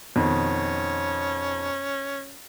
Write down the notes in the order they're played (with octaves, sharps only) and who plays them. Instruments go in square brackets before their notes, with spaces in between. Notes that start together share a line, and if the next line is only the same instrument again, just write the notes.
[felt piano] F2 B2 D#3 [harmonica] C#4